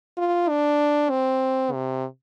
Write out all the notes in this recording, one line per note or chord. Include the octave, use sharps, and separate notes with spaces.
F4
D4
C4
C3